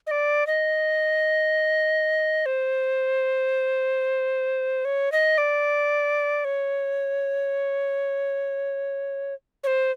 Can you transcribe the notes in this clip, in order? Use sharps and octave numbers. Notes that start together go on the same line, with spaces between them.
D#5
D5
D#5
C5
C#5
D#5
D5
C#5
C#5
C5